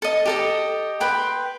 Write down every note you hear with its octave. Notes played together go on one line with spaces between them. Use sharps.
A4 D#5
G4 A4 D#5
B4 G5 C6